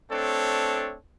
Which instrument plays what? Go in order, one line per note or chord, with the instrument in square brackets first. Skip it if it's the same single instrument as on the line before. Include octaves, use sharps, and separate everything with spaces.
[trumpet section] A3 C4 D4 A4 C#5